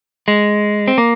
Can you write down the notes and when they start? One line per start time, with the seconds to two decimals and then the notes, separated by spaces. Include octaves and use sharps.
0.28 G#3
0.88 C4
0.98 A#3